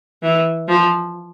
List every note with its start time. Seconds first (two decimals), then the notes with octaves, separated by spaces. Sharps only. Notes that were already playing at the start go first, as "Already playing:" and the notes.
0.23 E3
0.68 F3